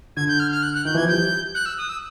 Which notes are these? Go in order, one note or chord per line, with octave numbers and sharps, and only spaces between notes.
D3 G#6
G6
F6
F6
F#6
F#6
D#3 G6
E3 G#6
F3
G3 G6
F#6
E6
D#6
E6